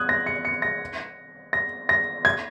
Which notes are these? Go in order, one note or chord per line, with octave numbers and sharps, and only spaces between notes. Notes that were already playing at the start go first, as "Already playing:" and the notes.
Already playing: D#6 F#6 G#6
A#6
C#7
C#7
A#6
A#6
A#6
G#6